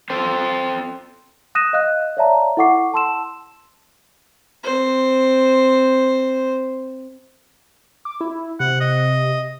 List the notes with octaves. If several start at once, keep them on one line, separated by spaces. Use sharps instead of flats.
C4 A4 C5
D#6 F#6 A#6 D#7 E7
D#5 F5 F#6
C#5 D5 E5 F5 A5 A#5
E4 A4 F#5 C#6 D6 C7
A5 C6 E6 E7
C4 C5
D6
E4
C3 F#5
D#5